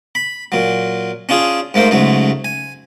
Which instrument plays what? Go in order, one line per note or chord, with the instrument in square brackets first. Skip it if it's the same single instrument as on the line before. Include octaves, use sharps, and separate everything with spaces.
[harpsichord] B5
A#2 F#3
C#4 D4 F4 G#4
G#2 A3 A#3 C5
C#2 G#2 F#3 A3
G#5